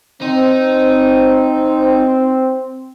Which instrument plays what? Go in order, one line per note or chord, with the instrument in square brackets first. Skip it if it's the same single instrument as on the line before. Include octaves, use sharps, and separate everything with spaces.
[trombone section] C4 [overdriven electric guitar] D#4